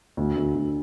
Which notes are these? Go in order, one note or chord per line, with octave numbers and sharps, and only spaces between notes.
D2
D2
D2